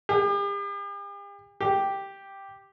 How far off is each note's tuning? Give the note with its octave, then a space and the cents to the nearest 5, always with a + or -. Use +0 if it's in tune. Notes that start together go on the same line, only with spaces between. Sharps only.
G4 +45
G4 +0